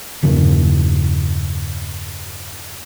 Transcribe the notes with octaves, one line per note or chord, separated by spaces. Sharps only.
E2 G2 C#3 A#3